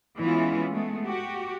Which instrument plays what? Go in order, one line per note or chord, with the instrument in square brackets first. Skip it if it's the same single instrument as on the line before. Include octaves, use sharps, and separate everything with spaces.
[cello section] E3 G#3 B3 C#4 E4 F4
G#3 A3 B3
F#4 G4